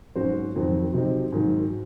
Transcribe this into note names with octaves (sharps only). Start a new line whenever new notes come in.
G#2 F#3 C#4 F#4 C5
F2 D#3 F#3 C4
C3 F#3 C4 D#4
G#2 D#3 F#3